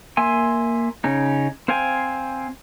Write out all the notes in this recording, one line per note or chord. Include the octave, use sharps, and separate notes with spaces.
A#3 E5 G#5 C6
C#3 C#4 D#4
C4 C5 F5 G5 G#5